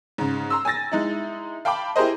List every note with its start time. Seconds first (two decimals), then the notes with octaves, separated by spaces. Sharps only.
0.18 G#2 C#3
0.50 A#5 C6 E6
0.65 G#5 E6 A6 A#6
0.92 G#3 D#4 E4
1.65 F5 G5 A5 B5 D6
1.96 E4 G4 G#4 A#4 C5 D#5